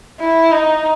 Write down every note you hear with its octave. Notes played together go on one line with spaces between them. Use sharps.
E4
D#4